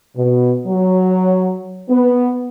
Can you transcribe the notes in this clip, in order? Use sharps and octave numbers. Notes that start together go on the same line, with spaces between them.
B2
F#3
B3